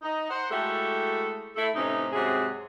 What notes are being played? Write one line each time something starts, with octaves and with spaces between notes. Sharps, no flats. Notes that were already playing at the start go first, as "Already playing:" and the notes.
D#4
C5 F#5
G#3 A3 E4 F#4 G4 A4
A3 E4 A4
A2 C3 E3 C4 C#4 D#4
G#2 C3 F#3 C4 F#4 G#4